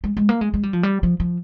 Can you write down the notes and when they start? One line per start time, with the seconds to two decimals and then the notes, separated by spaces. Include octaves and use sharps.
0.04 G#3
0.17 G#3
0.29 A#3
0.41 G#3
0.54 G#3
0.63 G3
0.73 F3
0.83 G3
1.03 F3
1.20 F3